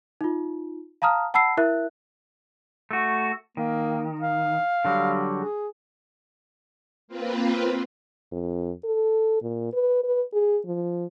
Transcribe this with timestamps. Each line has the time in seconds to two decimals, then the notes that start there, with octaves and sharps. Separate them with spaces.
0.21 D#4 F4
1.02 F5 A5 A#5 D#6 F6
1.34 F#5 A5 B5 E6 C7
1.57 E4 A#4 E5 F#6
2.91 A3 F#4
3.57 D#3 A#3
4.21 F5
4.85 D3 F#3 G3
5.36 G#4
7.08 A#3 C4 F4 B4
8.32 F2
8.84 A4
9.42 A#2
9.73 B4
10.04 B4
10.33 G#4
10.66 F3